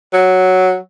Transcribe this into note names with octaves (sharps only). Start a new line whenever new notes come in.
F#3